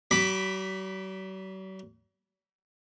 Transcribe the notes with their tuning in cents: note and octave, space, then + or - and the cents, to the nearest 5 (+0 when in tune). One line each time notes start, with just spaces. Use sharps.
F#3 +45 B5 +0 D6 +0